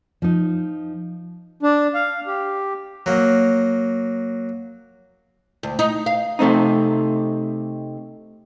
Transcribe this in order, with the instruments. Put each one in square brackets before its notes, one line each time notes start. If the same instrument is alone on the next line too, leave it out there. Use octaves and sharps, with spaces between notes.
[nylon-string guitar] F3 D#4
[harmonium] D4
F5
G4
[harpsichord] F#3 A#3
[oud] D2
D#4
F5
[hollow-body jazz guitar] C3 A3 C4 D#4